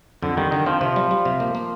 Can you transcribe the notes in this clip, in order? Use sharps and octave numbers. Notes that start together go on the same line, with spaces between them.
F2 D3
D#3 G3
D3 D#3
F3 C4
C3 F3
G3
G3
C3
A#3
A#3